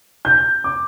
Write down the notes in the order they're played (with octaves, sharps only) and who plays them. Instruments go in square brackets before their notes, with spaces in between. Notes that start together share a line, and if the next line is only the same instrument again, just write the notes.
[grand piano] G6
D6